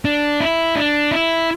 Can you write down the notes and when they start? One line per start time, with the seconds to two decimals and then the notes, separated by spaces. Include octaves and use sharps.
0.05 D4
0.40 E4
0.76 D4
1.11 E4